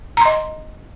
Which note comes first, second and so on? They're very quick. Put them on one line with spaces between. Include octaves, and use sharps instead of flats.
A#5 C6 D#5